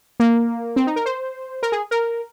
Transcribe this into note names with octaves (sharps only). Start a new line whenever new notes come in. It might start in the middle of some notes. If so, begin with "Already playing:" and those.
A#3
C4
D#4
A#4
C5
A#4
G#4
A#4